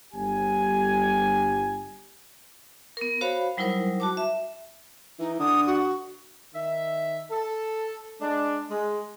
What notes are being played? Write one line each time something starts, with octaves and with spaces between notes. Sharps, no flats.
G1 G4 G#5
B3 A#4
F#4 C5 C#5 F5 B5
F#3 G3 D#4 E4 A#4 C5
F#4 A5 D6
E5
E3 D#4
D3 D#6
F#4
D#3 E5
A4
G#3 D4
G#3